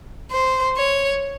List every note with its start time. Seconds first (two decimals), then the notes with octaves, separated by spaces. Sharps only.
0.31 C5
0.77 C#5